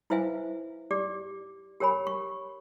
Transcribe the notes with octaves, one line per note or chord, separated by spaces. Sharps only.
E4 B4 C5 E5 F5 G#5
G4 D5 D6
G4 A#4 C#5 G#5 B5
C#6